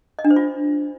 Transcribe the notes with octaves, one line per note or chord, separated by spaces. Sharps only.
D#5
D4
C5
F4